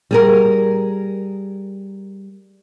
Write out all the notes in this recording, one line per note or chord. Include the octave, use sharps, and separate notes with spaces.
G3 G#4 A#4